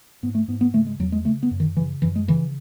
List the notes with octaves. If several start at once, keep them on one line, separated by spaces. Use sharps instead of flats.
G#2 B3
A3
G#2 B3
B3
C#3 A3
G#3
E2 F#3
G#3
C#3 A3
B3
F#2
D#3
C#3 E3
F#2 E3
G#3
C#3 E3